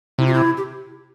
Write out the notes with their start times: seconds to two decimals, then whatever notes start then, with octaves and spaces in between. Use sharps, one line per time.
0.19 C3 E4
0.26 F4
0.34 E4
0.57 G4